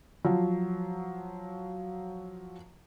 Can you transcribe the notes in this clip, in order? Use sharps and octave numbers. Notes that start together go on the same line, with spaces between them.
F3 F#3